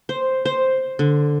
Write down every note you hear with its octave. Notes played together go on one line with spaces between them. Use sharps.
C5
C5
D3